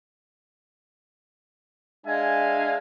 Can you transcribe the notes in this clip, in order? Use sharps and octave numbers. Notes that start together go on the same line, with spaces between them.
G#3 D4 E5 F5 G#5